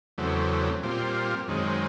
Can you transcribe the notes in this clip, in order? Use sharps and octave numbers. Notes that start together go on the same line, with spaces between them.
E2 C#3 F#3 A3 C4
A#2 G3 C4 F4
F#2 D#3 G#3 C4